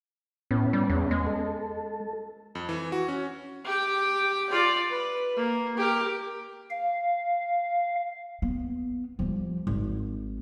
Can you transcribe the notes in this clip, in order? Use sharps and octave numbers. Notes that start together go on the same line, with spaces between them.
A2 B3 C#4
G3
E2
G#3
A4
F2
E3
F#4
C#4
G4 G5
F4 D5
B4
A#3
G4 A#4
F5
B3
F3 G3
G#1